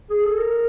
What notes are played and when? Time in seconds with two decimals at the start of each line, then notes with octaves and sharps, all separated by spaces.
0.10 G#4
0.24 A4
0.37 A#4